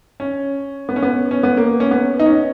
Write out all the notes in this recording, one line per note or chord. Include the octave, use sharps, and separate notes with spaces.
C#4
B3
C#4
B3
C#4
B3
A#3
C#4
B3
D#4
C#4